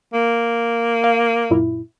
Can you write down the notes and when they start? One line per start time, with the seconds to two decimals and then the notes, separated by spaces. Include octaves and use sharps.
0.13 A#3
1.04 F5
1.50 F#2 A#2 E4